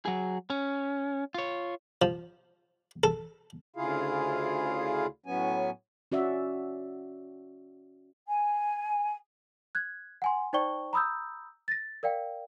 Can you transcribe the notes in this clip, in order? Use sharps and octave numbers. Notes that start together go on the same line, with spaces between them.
F#3 G#4
C#4
F4 C#5
F3
A4
D2 C#3 E4 F4 G#4 F5
A2 F#3 B3 C#4 G#5
C#4 F#4 D5 E5
G#5
F#6 G#6
F#5 G#5 C6
D#4 C5 D5 G5 C#6 G7
A#5 B5 D#6 E6 G6
A6 A#6
A#4 D5 F5 G5